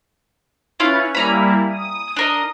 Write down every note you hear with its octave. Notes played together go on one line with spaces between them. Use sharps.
C#4 E4 F4 B4 C#5 F5
G3 A#3 E4 G#5 A#5 B5
D#6
D4 A#4 D#5